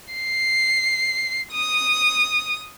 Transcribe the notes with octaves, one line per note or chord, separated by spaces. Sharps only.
C7
D#6